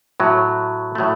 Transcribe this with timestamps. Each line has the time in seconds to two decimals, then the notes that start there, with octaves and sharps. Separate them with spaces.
0.20 A2 F#3 A3
0.95 A2 F#3 A3